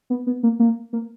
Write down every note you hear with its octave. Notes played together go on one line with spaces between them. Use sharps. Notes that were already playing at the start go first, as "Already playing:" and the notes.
B3
B3
A#3
A#3
A#3